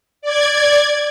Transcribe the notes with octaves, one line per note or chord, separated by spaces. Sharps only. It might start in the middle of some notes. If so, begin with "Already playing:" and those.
D5 G#6